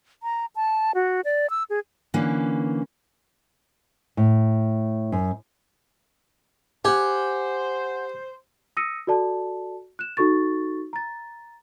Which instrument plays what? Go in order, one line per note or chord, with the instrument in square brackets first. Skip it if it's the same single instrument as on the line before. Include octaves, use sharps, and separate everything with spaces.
[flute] A#5
A5
F#4
D5
E6
G#4
[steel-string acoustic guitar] D3 E3 A#3 C#4
[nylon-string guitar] A2
F#2
[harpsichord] G4 [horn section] C5 [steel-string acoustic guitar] F#5 G#5
[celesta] D#6 E6 A#6 C#7 D#7
F#4 A4 D5 A5
F#6 E7
D#4 F#4 A4 C#6 A6
A#5 A6